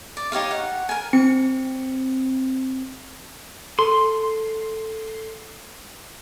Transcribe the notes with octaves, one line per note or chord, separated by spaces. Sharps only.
D5
D#4 G4 C#5 F5
F#5
A#4 G#5
C4 C#7
A4 C6